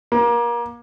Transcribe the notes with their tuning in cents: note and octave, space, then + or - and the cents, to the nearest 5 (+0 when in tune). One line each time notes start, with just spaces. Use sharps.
A#3 +30